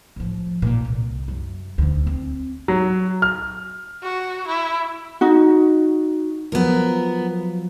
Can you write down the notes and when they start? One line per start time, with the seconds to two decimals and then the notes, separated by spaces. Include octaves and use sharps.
0.16 A2 F3
0.62 A1 A#2
0.85 C2
1.28 F#2
1.78 D2 D3
2.07 C4
2.68 F#3
3.22 F6
4.03 F#4
4.47 E4
5.21 D#4 F#4
6.52 F3 F#3 B3 A#4